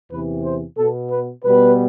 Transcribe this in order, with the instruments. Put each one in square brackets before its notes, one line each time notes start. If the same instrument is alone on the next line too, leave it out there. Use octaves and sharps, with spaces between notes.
[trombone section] E2 C3 E3 B4
C5
B2 B3 A4
B4
B2 G3 B3 B4